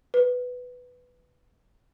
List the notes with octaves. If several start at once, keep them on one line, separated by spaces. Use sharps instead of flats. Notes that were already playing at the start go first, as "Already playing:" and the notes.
B4